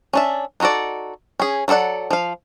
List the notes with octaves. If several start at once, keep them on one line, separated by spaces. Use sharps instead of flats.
C#4 D4 E5
B3 D#4 F#4 A4 D5
C#4 G#4
F#3 F4 A4 D5 F#5
F3 F5